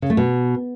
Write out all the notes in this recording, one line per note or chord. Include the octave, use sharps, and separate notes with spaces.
C#3
A3
B2